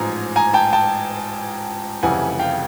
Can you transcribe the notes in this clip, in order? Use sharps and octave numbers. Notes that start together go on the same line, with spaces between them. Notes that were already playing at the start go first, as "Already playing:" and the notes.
Already playing: A1 G#2 F3 G#3 G#5 A#5
G#5 A#5
G5 A5
G5 A5
F1 F2 C#3 E3 G3 F#5 G#5
F5 G5